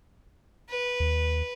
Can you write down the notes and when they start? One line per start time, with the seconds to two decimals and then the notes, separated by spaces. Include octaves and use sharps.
0.69 B4
1.00 D#2